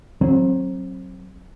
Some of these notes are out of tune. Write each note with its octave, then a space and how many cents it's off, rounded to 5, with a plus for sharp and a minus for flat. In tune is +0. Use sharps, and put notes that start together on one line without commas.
F#3 +10 C4 +30